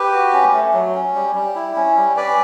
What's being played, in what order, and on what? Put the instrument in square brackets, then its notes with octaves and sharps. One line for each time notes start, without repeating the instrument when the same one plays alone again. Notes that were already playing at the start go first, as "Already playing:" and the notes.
Already playing: [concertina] G4 B4
[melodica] F#4
C#4
A3
F#3
C#4
G3
G3
E4
C#4
G3
[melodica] C#4 [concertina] B4 D5